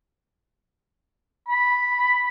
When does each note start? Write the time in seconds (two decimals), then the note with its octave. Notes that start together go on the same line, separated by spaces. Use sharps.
1.49 B5